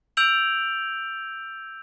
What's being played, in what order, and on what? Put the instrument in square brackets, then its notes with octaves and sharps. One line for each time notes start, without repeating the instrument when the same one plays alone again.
[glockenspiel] E6 G6 D7 F7 F#7